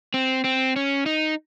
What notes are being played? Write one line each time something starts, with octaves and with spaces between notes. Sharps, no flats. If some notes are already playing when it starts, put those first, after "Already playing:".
C4
C4
C#4
D#4